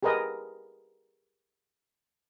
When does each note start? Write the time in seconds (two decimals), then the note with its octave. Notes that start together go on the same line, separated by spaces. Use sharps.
0.03 G4 G#4 A#4 B4 D#5